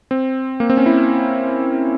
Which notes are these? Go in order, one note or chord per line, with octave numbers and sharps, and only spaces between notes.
C4
A#3
C4
C#4
E4